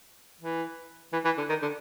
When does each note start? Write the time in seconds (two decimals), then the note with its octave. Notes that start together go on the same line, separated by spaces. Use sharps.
0.41 E3
1.13 E3
1.25 E3
1.37 D3
1.49 D#3
1.62 D3